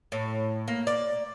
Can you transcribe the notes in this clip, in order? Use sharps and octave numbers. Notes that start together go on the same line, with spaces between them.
A2
A#3
D5